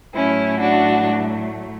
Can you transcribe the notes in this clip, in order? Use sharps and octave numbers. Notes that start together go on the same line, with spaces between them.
A2 F#3 A3 C#4 E4
D4 F#4